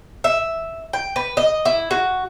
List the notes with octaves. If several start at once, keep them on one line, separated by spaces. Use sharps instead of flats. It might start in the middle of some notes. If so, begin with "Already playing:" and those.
E5
G5
B4
D#5
E4
F#4